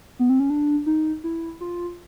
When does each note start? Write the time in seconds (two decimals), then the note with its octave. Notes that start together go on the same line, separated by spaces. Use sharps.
0.19 B3
0.29 C4
0.40 C#4
0.50 D4
0.86 D#4
1.24 E4
1.61 F4